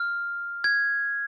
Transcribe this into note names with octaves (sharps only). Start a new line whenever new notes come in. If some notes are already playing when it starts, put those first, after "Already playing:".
Already playing: F6
G#6